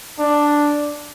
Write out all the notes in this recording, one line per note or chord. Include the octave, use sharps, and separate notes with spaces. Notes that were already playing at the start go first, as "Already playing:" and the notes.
D4